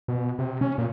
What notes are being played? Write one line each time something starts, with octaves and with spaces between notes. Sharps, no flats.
B2
C3
C#4
A#2